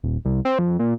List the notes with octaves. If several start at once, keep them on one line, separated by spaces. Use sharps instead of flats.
D#1
C2
C4
F2
A#2